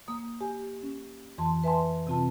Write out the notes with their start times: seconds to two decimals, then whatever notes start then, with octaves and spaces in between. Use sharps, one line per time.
0.08 A#3 D#6
0.41 G4 G#5
0.83 C#4
1.38 F2 E3 A5 C6
1.64 B4 E5 G#5 A5 C6
2.07 C3 C4 F4 A5